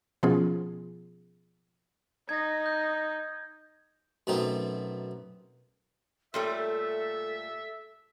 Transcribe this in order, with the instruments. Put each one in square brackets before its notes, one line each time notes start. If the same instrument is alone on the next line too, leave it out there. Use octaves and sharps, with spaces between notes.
[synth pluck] B2 F3 B3 C#4 F4 G#4
[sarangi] D#4 [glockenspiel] G#6 A#6
[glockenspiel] G6
[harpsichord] F#2 B2 A3 C4 D#4
[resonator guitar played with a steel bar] A#2 G3 A3 [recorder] A4 [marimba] C#5 G5 C6 [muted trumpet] E5